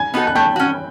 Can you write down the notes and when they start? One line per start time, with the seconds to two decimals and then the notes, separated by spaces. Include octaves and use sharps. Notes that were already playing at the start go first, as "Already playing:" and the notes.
Already playing: G#5 G#6
0.14 B3 D#4 F#4 A4
0.27 F#6
0.35 A3 G5 G6
0.56 C#4 F#4